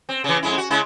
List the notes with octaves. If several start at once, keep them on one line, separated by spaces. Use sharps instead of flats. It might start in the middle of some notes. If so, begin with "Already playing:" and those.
C4
C#3 E3
F2 G#3 E4
F#4
C#3 G#3 E4